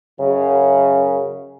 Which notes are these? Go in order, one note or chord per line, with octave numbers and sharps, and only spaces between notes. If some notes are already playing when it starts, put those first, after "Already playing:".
F#2 C#3